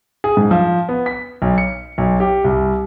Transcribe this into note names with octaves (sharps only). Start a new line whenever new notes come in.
G#4
G#2
F3
B3
B6
B1
C#7
B1
G4
C2